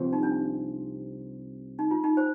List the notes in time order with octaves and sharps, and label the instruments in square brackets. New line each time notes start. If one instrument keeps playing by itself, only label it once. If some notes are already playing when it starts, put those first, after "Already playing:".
Already playing: [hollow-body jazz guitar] C2 C3 F3 C4
[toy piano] D#4
D4
D#4
F4
D#4
C5